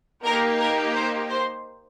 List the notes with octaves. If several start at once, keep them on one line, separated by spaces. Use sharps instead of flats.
A#3 D#4 G4 A#4
A#4
C5
C5